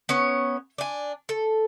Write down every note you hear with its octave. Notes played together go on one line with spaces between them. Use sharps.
B3 C#4 C#5
D4 G#5
A4